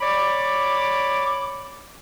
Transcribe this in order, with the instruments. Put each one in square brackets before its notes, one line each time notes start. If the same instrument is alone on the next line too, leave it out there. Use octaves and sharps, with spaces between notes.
[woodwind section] C#5 D5 B5 D6